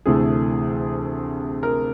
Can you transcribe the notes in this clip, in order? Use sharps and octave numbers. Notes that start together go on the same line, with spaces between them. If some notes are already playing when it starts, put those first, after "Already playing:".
D2 C3 E3 A3 G#4
A#4